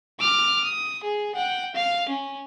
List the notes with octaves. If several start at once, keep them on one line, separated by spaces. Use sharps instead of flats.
D6 F6
D#6
G#4
F#5 G5
F5
C#4